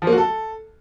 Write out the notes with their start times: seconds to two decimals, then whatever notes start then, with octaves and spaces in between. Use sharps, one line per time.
0.02 F3
0.07 A#3
0.12 F#4
0.18 A4